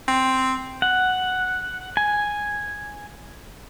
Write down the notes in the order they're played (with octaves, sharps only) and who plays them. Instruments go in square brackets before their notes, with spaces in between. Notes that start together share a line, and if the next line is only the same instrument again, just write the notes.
[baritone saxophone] C4
[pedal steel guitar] F#5
G#5